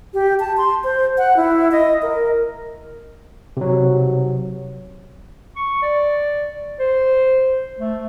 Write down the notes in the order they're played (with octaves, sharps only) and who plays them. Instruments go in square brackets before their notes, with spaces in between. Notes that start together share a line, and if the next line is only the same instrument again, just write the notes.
[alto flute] G4
A5
C6
C5
F#5
E4
D#5
A#4
[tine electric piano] C3 F#3
[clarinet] C#6
D5
C5
A3